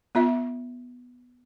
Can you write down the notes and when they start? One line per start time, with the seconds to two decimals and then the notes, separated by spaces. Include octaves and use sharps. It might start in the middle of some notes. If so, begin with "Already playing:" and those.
0.15 B3 F4 E5